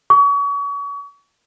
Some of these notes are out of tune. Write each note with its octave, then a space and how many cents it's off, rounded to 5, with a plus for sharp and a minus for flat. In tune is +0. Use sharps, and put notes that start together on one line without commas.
C#6 +35